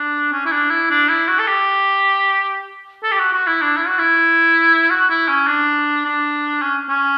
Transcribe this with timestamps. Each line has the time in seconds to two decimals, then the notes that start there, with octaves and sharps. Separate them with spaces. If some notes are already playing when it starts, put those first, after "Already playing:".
Already playing: D4
0.32 C#4
0.45 E4
0.52 D4
0.70 E4
0.91 D4
1.09 E4
1.28 F#4
1.39 A4
1.47 G4
3.03 A4
3.11 G4
3.19 F#4
3.33 F#4
3.47 E4
3.62 D4
3.77 E4
3.87 F#4
3.98 E4
4.90 F#4
5.10 E4
5.28 C#4
5.47 D4
6.05 D4
6.62 C#4
6.89 C#4